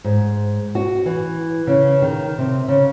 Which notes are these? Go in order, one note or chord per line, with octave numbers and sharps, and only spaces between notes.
G#2
F#4
E3
C#3
D#3
C3
C#3